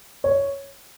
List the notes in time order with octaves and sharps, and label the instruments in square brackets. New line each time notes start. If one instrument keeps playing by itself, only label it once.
[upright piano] C#5